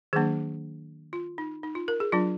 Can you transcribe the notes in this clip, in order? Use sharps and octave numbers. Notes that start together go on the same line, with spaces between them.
D#3 F#3 A#3 D4 G#4
F4
D#4
D#4
F4
A#4
G#4
F#3 D4 F4